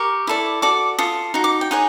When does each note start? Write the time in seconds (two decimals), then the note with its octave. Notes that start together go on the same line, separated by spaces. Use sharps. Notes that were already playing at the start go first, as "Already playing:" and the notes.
Already playing: G4 A#4 C#6
0.27 E4 A4 D5
0.62 F#4 A4 D5 D6
0.99 F4 A4 D#6
1.34 D#4 F#4
1.44 D6
1.61 G5
1.71 D#4 G#4 C#5 F#5